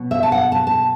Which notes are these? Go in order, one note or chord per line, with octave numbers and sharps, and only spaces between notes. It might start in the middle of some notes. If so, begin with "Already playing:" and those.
Already playing: B2 F#3
E5
A5
F#5
A5
A5